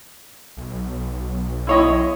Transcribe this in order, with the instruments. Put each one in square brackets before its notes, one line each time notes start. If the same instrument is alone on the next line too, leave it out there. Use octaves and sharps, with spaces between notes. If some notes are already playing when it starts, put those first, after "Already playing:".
[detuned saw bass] B1
[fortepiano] E4 C#5 D#5